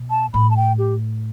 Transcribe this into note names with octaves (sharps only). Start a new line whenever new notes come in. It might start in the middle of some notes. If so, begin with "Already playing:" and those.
Already playing: B2
A5
A2 B5
A5
G5
G4